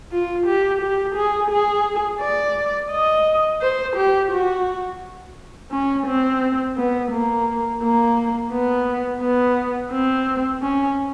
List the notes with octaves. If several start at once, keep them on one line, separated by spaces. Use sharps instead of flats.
F4
G4
G4
G#4
G#4
D5
D#5
C5
G4
F#4
C#4
C4
B3
A#3
A#3
B3
B3
C4
C#4